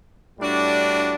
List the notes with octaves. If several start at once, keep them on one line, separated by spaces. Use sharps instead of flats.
A2 G3 D4 F#4